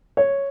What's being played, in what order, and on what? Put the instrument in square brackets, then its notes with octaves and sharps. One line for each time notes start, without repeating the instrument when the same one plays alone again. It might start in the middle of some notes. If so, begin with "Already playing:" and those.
[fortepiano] C#5